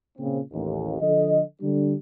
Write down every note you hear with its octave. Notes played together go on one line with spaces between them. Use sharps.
A#2 C#3 C4
A1 D#2
D3 F3 A4 D#5
D3 G3 D4